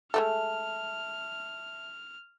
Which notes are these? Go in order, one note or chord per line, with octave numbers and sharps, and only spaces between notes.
G#3 A3 A4 E5 A5 F6